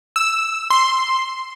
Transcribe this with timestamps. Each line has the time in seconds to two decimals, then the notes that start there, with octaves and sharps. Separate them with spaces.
0.16 E6
0.70 C6